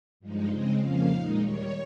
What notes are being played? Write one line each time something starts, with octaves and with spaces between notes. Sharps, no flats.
G2 F3 G#3 D#4
C#3 G#3 C4 D#5
F2 C#3 F3 A#3 F5
A#2 G#3 D#4
D#2 D#3 G3 C#5